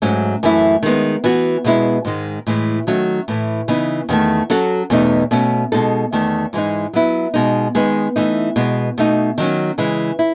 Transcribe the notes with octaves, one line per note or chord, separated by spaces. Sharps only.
G#2 F#3 A3 C#4
F#2 E3 A3 E4
D#3 G#3 B3
E3 B3 F#4
B2 G#3 B3 E4
G#2 D#3 G#3
A2 E3 G#3
D#3 F#3 A3 C#4 F#4
A2 E3 A3
C#3 E3 B3 D#4
E2 D#3 A3
F#3 C#4 F#4 A4
E2 B2 A3 D#4
B2 A3 C#4
B2 G#3 D#4 A4
E2 D#3 A3
G#2 E3 G#3 D#4
F#3 B3 E4
B2 G#3 D#4
D#3 G#3 B3 D#4
E3 A3 D#4
B2 G#3 B3
B2 A3 D#4
D#3 F#3 C#4
C#3 E3 G#3
E4